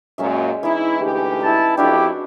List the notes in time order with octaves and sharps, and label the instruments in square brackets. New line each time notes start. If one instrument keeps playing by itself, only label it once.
[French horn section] F#2 A#2 [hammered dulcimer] G#3 C#4 E5
[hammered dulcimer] E3 D#4 [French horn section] E4
[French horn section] D2 G4
[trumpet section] E4 A5
[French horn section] F2 [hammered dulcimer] D4 F#4 B5 [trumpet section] E4 G4